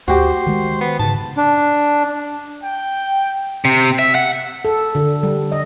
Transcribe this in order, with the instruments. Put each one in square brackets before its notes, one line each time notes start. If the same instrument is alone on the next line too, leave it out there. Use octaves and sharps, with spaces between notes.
[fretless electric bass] D2 [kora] F#4 G4 [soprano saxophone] C5
[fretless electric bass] D#3 G#3
[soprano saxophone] B3
[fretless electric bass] G#2 C#3 [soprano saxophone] A5
[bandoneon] D4
[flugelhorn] G5
[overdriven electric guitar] C3
E5
F#5
[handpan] A4
D3
G3
D#5